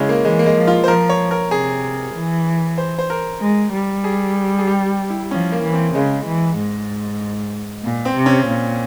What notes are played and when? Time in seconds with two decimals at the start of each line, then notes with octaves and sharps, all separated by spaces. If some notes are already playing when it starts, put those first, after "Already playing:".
Already playing: C#3 G#3 C#4 E4
0.09 A#3
0.25 E3 G#3
0.39 A#3
0.46 G#3
0.56 F3
0.67 F4
0.84 C5
0.88 F3 A#4
1.09 C#5
1.31 A#4
1.51 C3 G#4
2.15 E3
2.78 C5
2.99 C5
3.10 A#4
3.41 G#3
3.73 G3
4.04 G#4
4.58 G#4
4.67 G4
5.10 E4
5.31 F3 C#4
5.52 A#3
5.63 E3
5.73 C4
5.95 C#3 G#3
6.26 E3
6.57 G#2
7.84 A#2
8.05 C4
8.16 C3
8.26 C#4
8.48 A#2